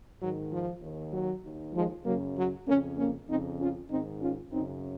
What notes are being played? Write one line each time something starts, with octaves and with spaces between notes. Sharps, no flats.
G#2 D#3 F#3
F3
D#2 D#3
F#3
D#2 D#3
F3 G#3
F#2 C#3 F#3 A#3
F#3
F2 C#3 A#3 C#4
A#3 C#4
F2 C#3 C4 D#4
C#4 F4
G#2 D#3 C4 D#4
C#4 F4
F#2 C#3 C4 D#4